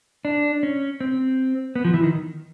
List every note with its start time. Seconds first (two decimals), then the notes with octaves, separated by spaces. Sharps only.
0.25 D4
0.63 C#4
1.01 C4
1.76 B3
1.85 F3
1.94 E3
2.03 D#3